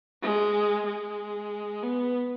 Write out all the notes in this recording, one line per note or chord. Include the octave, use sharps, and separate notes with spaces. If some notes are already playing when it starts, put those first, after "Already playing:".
G#3
G#3
B3